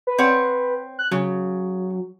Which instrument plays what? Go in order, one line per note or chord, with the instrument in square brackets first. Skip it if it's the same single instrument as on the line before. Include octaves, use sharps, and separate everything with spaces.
[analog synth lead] B4
[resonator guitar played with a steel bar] C4 C#5 F#5
[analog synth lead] F#6
[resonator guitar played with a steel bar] C#3 [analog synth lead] F#3